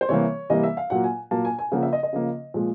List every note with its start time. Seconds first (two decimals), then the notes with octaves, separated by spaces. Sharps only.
0.01 C5
0.09 C3 E3 G3 A#3 C#5
0.50 C3 E3 G3 A#3 D#5
0.63 E5
0.77 F5
0.90 A#2 F#3 A#3 F#5
1.04 G#5
1.31 A#2 F#3 A#3 A5
1.45 G#5
1.58 G#5
1.72 C#3 F3 A#3 F#5
1.83 E5
1.93 D#5
2.03 D#5
2.13 C#3 F3 A#3
2.54 A#2 F3 G#3